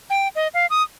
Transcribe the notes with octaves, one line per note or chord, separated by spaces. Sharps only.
G5
D#5
F5
D#6